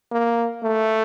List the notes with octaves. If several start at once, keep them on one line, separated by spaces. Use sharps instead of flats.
A#3
A3